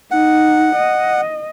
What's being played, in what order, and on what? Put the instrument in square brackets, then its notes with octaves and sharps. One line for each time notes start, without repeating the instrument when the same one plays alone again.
[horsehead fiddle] D#4 [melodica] F#5
[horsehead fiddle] D#5